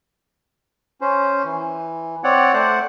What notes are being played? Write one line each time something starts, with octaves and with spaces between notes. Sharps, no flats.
C#4 C5
E3
C4 C#5 D5 F#5
A3 C5 D5 F#5